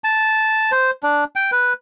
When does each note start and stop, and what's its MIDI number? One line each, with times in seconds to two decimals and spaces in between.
0.04 0.71 81
0.72 0.91 72
1.03 1.24 62
1.36 1.51 79
1.52 1.73 71